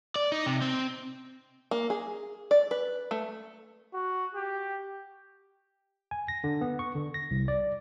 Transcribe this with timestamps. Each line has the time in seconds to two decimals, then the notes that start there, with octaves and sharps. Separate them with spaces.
0.16 D5
0.32 D#4
0.46 C3
0.62 C4
1.71 A#3
1.90 G#4
2.51 D5
2.71 B4
3.11 A3
3.94 F#4
4.35 G4
6.11 G#5
6.28 A#6
6.44 D3
6.61 B3
6.79 C#6
6.95 D3
7.14 A#6
7.31 C2
7.48 D5